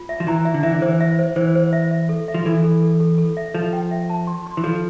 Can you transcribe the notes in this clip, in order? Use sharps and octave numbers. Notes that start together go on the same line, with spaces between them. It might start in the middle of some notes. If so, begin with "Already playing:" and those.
Already playing: F4
E5
F3
E3 A#5
E5
D3
E3 E5
D3
E3 C5
E5
C5
E3 C5
C5
E5
E5
A4
E5
F3
E3 A4
A4
A4
A4
A4
E5
F3 A4
G5
E5
A5
C6
C6
E3
F3 A4